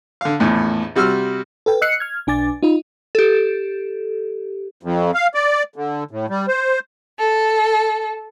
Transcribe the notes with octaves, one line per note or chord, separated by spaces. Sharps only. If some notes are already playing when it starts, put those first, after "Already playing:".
D3 F5
A#1 E2 A2
C3 G3 F#4 E6 F6
A4 B4 G5
D#5 E6 F#6 C7 C#7
F6 G#6
B1 D4 G#5 D6 A6
D#4 F4 D#5
G4 A4
F2
F5
D5
D3
A2
G3
C5
A4